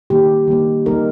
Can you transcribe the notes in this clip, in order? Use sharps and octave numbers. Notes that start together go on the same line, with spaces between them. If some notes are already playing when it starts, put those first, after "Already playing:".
D#3 G3 A#3 D#4 G4
D#3 G3 A#3 D#4
D#3 G3 A#3 D#4 A#4